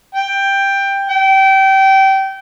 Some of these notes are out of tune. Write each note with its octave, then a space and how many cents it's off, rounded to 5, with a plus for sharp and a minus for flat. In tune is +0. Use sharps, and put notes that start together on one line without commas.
G5 +10
G5 -25